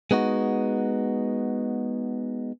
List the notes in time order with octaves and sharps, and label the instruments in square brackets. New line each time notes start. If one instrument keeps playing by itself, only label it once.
[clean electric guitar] G#3 B3 D#4 F#4